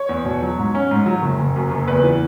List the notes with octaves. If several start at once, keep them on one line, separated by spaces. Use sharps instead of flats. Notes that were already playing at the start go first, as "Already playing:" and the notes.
Already playing: C#5
E2
B2
F#3
G#2
C#4
G#2
F#3
F#1
F#1
F#2
F#1
E2 B4
E3